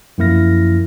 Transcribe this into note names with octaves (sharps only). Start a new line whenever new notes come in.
F#2 F3 A#3 E4 F6 A#6